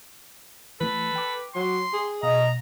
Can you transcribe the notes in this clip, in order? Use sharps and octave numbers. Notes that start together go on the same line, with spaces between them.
E3 A3 A4 B4
G5 D6
F#3 C6
G#4
B2 D#5 F5 A#5